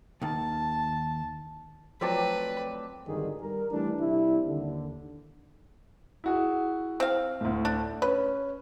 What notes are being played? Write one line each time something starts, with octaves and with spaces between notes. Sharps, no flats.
D#2 D#3 A5
F3 F#3 A3 C4 B4 D5 A5
G#1 G2 D3 D#3 G#4
G3 A#4
E3 G3 A3 D4
C3 G3 D4 E4
D#2 D3
E4 F#4 G#4
C4 F5
D2 A2
D4
C#4 B4